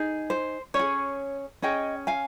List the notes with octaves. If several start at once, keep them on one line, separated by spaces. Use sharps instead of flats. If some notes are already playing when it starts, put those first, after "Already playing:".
Already playing: D#4 G#4
C5
C#4 C#5
G#4
C#4 G#4 D#5 G5
F5 G#5